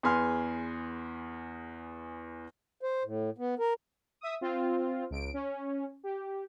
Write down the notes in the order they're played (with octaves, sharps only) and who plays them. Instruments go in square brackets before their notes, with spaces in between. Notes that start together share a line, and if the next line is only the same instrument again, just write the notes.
[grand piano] E2 G#4 B4 G#5 C6 F6
[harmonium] C5
A2
B3
A#4
[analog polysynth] E5 D#6
C4 F4
C#2 D7
C#4
G4